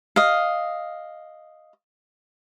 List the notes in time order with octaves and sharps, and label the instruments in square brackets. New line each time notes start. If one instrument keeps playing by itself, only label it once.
[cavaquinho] D#5 F5